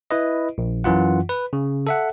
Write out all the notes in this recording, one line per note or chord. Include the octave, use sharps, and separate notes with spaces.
E4 B4 D#5
A#1
F#2 E3 F4 F#5
B4
C#3
A4 E5 F#5